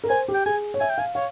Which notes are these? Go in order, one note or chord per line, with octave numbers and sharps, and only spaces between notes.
A#4
C5 G#5
G4
G5
G#4 G#5
C#5
E5 G#5
G5
F5 G#5
C#5 F5